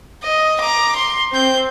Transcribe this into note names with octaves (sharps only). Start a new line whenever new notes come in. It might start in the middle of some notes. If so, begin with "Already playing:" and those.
D#5
A#5 D6
C6
C4 G6